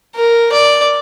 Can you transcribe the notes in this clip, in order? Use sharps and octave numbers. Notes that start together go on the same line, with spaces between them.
A#4
D5